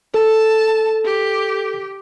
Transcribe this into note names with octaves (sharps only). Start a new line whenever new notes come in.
A4 A5
G4